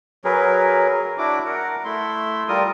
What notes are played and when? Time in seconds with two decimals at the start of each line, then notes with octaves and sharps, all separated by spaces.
0.24 F#3 G#4 A#4 B4
0.90 A#4
1.18 D4 E4 F#4 D6
1.46 A#4 F#5
1.85 A3 E4 C6
2.48 G3 F4 A#4 D#6